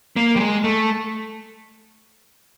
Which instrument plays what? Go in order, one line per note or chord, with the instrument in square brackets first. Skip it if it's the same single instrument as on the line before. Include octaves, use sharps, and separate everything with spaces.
[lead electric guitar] A#3
G3
G#3
A3